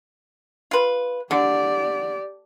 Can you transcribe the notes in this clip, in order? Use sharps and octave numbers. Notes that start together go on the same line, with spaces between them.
F4 B4
D3 G4 D5